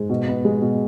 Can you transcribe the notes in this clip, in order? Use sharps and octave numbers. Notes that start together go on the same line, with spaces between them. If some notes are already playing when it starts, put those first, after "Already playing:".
Already playing: G#2 G#3 G#4
B2
B3
G#3
B2